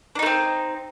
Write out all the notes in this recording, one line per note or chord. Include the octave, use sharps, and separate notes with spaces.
A3 C4 D4 D#4